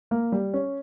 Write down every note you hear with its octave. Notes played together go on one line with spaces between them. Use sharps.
A#3
G3
C#4